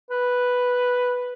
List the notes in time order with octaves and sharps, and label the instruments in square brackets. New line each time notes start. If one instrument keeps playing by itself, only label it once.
[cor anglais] B4